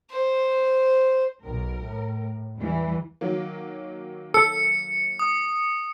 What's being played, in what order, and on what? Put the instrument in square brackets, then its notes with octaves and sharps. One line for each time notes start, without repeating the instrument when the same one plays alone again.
[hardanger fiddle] C5
[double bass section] B1 [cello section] A#4
[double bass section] A2
[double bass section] E2 [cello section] E3 G3
[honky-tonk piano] D#3 F#3 A#3
[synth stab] A4 [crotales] C#7
[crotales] D#6